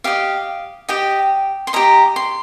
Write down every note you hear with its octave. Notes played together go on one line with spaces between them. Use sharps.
G4 D#5 F5
G4 D#5 G5
C6
G4 D#5 A#5
C6